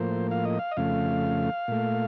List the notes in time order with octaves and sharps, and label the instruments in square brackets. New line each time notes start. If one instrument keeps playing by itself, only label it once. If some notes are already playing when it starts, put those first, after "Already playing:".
Already playing: [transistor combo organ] A2 F3 A#3 C5
F5
D#5
F5
D#5
F2 C#3 A3 F5
A#2 A3